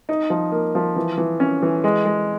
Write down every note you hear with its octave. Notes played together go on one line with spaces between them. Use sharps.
D#4
F3
A#3
F3
E3
E3
C#4
E3
G#3
G#3